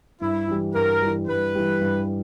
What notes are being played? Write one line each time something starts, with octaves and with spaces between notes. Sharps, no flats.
G2 E4
E3 G3
G2 A#4
E3 G3
G2 B4
E3 G3
G2